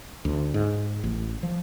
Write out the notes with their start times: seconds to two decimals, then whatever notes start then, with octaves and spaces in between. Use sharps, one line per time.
0.25 D2
0.54 G#2
1.04 A1
1.43 F3